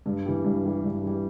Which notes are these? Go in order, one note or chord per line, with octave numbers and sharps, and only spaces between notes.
G2
E3 G3
G2
E3 G3
G2
E3 G3